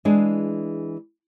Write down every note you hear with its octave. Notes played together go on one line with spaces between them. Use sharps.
E3 G#3 D4 G#4